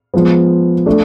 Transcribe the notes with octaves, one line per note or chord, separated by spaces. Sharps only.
F3 G#3 B3
A3 D4 A4 D5